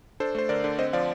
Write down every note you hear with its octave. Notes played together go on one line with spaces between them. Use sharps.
D4 A4 C5
A3 C5
D3 A#4 D5
D3
C4 C5 D#5
F3 D5 F5